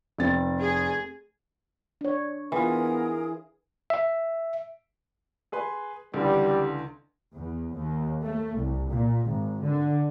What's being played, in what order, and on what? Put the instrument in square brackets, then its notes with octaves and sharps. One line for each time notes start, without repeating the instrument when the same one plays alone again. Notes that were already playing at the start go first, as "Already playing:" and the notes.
[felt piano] F1 C4 A6
[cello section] G#4
[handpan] D4 C#5
[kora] E3 F4 [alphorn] B3 [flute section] G#4 A#4 D#6
[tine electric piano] E5
[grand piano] G#4 B4 C6
[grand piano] C#2 D3 E3 [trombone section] G3
[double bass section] E2
D#2
A3
C2
A#2
G#1
D3